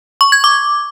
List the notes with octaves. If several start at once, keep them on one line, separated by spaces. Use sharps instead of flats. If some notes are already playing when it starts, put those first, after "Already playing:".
C#6
G#6
D6